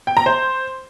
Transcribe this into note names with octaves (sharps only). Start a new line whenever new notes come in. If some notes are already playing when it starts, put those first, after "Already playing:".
G5
A#5
C5